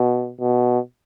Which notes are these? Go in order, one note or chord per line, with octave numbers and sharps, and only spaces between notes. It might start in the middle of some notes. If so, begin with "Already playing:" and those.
Already playing: B2
B2